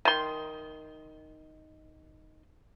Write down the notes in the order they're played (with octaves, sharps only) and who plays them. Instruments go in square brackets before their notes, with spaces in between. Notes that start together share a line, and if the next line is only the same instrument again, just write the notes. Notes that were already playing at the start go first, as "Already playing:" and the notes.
[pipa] D#3 C6